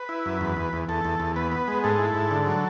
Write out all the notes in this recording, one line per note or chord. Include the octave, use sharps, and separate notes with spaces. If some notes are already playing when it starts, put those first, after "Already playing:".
Already playing: B4
E4
F#2
E2
E2
E2
E2 A4
E2
E2
B3 B4
B3
G#3
G#2 A4
E4
G#2
D3
F#3